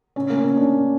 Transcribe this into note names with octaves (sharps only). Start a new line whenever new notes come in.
C#4
A#3
C#4
D4